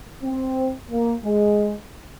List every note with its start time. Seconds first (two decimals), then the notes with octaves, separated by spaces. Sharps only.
0.23 C4
0.90 A#3
1.24 G#3